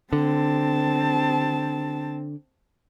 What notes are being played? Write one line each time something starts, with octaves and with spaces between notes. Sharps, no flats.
D3 C4 A5